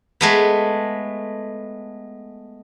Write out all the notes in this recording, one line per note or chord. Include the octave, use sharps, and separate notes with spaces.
G#3 A3 B3